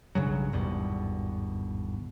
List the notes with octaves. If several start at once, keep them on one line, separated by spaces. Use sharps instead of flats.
B1 G2 C#3 F#3
G#1 E2 G2 B2